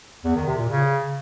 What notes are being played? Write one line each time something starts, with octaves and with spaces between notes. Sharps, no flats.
E2
D#3
C3
A#2
C#3